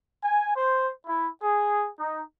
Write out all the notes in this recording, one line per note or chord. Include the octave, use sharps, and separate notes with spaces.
G#5
C5
E4
G#4
D#4